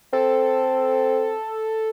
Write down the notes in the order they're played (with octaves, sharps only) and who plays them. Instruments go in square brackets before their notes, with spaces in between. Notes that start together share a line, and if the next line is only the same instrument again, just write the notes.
[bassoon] C4 [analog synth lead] A4